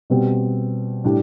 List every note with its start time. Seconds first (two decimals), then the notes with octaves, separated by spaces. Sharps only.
0.10 B2 G3 C4
1.04 A2 G3 D4